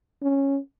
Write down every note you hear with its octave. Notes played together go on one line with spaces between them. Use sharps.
C#4